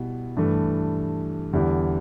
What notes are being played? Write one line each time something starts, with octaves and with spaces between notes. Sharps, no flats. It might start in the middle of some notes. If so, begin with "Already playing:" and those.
Already playing: B2 G3 E4
G2 E3 A3
E2 D3 G3 E4 G4